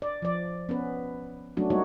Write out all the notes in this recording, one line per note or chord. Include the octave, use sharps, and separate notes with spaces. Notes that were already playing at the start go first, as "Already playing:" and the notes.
D5
F3 D5
B3 C#4 B4
F#3 A3 C#4 D4 F#4
G3 A#3 D#4 F#4 C#5